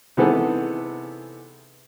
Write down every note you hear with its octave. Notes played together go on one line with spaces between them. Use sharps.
C3 E3 B3 D#4 G#4 A4